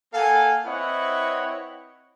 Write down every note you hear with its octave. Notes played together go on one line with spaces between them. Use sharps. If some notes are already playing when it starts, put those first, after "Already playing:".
A#3 A4 F5 F#5 G#5
C4 E4 B4 C#5 D#5 F#5